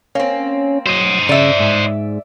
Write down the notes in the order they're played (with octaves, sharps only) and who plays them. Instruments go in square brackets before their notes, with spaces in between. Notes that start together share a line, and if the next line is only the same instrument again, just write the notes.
[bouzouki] A#3 C4 [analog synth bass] C#4
[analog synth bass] F#3 [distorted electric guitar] C5 D#5
[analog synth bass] C#3 [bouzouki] D5 E5
[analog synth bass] G#2